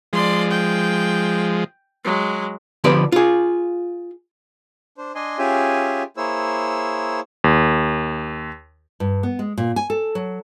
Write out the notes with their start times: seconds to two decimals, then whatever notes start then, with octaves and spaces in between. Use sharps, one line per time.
0.13 F3 G#3 D5 C6
0.50 G5
2.04 F#3 G#3
2.84 D3 F3 B3 G4 B4 D5
3.12 F4 G#4
4.98 D4 C5
5.15 D4 D#5 G#5 C6
5.38 C#4 F4 G4 G#4 E5 G#5
6.17 A#3 E4 G#4 C5 C#5 E6
7.44 D#2
9.00 G2
9.23 B3
9.39 G#3
9.58 A#2
9.76 G#5
9.90 A4
10.15 F#3